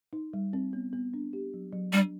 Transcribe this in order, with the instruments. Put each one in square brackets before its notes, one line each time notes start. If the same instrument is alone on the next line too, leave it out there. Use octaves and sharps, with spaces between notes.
[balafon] D#4
G3
C4
B3
B3
D4
G4
F#3
F#3
[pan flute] G3 [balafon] D4